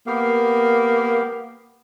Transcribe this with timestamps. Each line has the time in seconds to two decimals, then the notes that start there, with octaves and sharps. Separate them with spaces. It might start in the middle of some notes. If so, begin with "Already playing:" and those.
0.07 A#3 B3 G4 F5